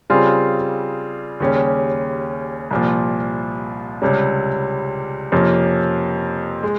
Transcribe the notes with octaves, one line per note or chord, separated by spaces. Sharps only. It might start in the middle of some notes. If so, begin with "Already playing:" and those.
C#3 G3 C4 F4 G#4
D#2 C#3 G3 C#4 G4
C2 A#2 F3
C#2 C3 G3 C#4
F2 C3 F3 A#3 C#4
G#3